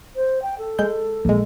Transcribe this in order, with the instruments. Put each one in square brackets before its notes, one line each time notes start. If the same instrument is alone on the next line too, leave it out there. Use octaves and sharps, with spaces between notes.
[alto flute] C5
G5
A4
[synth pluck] G#3 G6
A#1 G#3